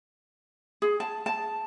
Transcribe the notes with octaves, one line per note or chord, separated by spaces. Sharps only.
G#4
A5
A5